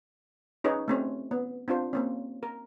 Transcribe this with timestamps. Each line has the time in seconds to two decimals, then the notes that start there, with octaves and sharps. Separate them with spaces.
0.64 C#4 D#4 G#4 B4 C#5
0.88 A3 C4 C#4
1.31 B3
1.68 C4 D4 F4 C5
1.93 A#3 C4 C#4
2.43 A#4